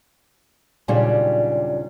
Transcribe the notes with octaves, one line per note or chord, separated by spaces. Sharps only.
D#2 A#2 C#3 F#3 G3 D4